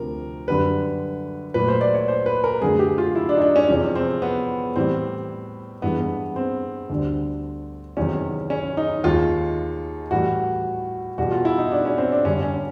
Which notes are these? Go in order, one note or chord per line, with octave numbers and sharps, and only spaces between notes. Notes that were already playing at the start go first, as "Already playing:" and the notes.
Already playing: D2 C3 F3 A3 A#4
F#2 D3 G3 B4
A#2 F#3 A3 B4
C5
D5
C#5
C5
B4
A#4
F#2 D3 F#3 A3 G#4
G4
F4
E4
D4
D#4
D4
C#4
E2 C3 F3 G#3 C#4
C4
B3
A2 E3 G3 C4
G2 E3 G#3 B3
B3
C4
D2 D3 G3
E2 C3 D#3 F#3 C#4
C#4
D#4
D#2 D#3 G#3 F4
A2 E3 G3 F#4
E2 B2 G3 F#4
F4
E4
D#4
D4
C#4
C4
D4
G2 D3 G3 C#4
C#4